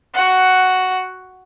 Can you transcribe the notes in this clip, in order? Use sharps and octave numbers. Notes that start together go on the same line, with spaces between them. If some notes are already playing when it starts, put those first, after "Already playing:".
F#4 F#5